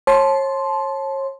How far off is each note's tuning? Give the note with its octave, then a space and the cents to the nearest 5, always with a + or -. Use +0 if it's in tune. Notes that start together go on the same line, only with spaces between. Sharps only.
C#5 -35 A5 -20 C6 +0